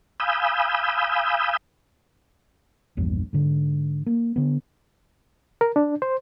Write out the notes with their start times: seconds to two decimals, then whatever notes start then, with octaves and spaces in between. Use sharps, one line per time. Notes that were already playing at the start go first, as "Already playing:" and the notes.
0.20 F5 G#5 B5 D#6 E6 G6
2.97 A#1 E2 G2
3.33 G#2 D3
4.06 A#3
4.36 D3 B3
5.61 A#4
5.76 D4
6.02 C5